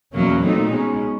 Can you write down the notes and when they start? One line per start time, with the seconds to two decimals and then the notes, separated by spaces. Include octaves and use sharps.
0.14 E2 B2 F#3 A#3 C#4
0.41 A#2 F#3 A3 C4 D#4
0.70 B2 G#3 C#4